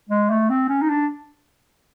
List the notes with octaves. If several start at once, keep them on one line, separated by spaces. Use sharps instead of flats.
G#3
A3
C4
C#4
D#4
D4